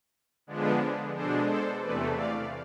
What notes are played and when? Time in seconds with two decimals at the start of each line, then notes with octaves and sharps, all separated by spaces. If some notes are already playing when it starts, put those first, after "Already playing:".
0.47 D3 F3 G#3 B3 D4
1.14 B2 G#3 D4 A4 C5
1.48 A4 C5
1.81 E2 C3 E3 A3 B4 D5
2.15 D5 F5